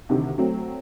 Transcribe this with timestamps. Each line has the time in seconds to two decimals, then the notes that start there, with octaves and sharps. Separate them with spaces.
0.09 D2 C3 D#3
0.38 F#3 A3 C4